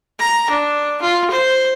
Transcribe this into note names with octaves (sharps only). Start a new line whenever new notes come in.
A#5
D4
F4
C5